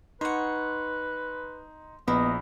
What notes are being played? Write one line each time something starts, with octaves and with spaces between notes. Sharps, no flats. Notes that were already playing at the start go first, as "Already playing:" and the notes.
D#4 B4 C#5 F#5 C6
A#1 B3 E4 D#5